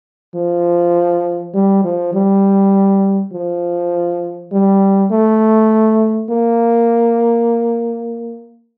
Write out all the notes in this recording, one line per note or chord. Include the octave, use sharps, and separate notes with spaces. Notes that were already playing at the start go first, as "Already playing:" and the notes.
F3
G3
F3
G3
F3
G3
A3
A#3